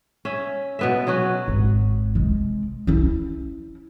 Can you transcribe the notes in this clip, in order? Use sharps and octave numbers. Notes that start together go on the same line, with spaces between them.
C#4 E5
B2 B3 E5
F#3 B3 C#4 F#4
G#1
C3 G#3
C#4 E4